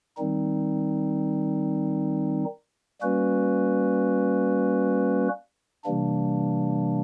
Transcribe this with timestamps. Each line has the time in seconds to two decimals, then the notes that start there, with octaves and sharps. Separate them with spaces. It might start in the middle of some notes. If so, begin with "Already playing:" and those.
0.17 D#3 G3 C4 D#4
3.01 G3 A#3 C#4 F#4 B4
5.85 C3 E3 G3 A#3 D4